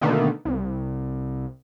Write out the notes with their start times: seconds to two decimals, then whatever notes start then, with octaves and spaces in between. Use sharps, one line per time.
0.01 B2 D3 D#3 A3 A#3
0.45 C2